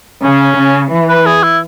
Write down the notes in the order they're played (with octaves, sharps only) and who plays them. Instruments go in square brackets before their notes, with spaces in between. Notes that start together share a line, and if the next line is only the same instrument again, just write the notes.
[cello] C#3 [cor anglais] C#4
[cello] C#3
E3
[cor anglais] B4
G#4
E4